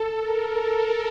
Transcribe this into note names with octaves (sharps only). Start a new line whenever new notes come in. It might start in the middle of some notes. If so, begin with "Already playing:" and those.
Already playing: A4
A#4